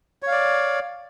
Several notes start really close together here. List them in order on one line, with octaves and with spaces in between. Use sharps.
C#5 F5 D5